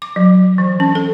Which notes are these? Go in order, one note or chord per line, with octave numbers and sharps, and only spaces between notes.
D6
F#3
E3
C#4
A4